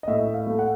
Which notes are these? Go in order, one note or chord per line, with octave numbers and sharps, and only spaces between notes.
D#5
A2 E5
F5
A3
F#5